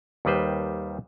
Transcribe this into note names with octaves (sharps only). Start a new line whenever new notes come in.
D#2 D#3 G3 B4 C5